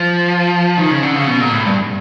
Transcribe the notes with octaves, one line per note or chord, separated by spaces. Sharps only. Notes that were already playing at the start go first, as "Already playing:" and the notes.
Already playing: F3
D#3
C#3
D3
C#3
B2
A#2
A2
G2